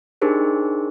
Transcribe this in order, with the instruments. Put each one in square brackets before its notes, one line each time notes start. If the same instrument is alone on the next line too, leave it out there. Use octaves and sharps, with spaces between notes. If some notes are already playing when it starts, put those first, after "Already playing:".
[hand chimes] D4 D#4 G4 G#4 A#4 C5